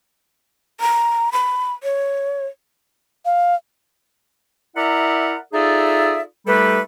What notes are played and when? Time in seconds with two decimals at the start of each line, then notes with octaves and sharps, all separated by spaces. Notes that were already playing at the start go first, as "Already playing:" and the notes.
0.80 A#5
1.33 B5
1.83 C#5
3.25 F5
4.75 E4 A#4 D5 E5 F#5 A#5
5.53 D#4 F4 G#4 A4 D5 E5
6.47 G3 A3 D#4 G4 A4 B4